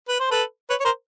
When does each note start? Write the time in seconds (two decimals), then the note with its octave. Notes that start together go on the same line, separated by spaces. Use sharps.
0.09 B4
0.20 C5
0.31 A4 B4
0.70 B4 C#5
0.80 C#5
0.85 A#4 C5